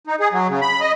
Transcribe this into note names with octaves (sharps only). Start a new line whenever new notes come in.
D#4
G#4
F#3
C#3
B5
D#5